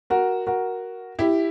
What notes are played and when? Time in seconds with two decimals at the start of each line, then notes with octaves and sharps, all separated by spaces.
0.10 F#4 A#4
0.47 F#4 A#4
1.19 E4 G4